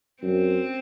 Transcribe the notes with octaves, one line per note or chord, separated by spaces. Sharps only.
F#2 C4